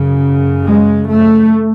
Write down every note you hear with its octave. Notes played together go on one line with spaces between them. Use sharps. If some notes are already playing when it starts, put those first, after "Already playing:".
Already playing: F#2 C#3
G#3
A3